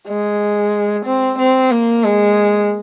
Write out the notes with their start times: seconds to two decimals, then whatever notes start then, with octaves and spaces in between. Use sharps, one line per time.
0.08 G#3
1.06 C4
1.38 C4
1.71 A#3
2.04 G#3